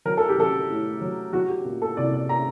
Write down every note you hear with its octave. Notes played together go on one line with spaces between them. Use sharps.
F#3 A#4
A4
G4
F#3 A4
A2
F#3
F#3 F#4
G4
A#2
A4
C2 D5
D5
A#5